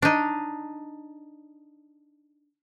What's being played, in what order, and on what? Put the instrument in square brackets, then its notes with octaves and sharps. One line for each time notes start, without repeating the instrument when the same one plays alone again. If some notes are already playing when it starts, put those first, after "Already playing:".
[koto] D4 D#4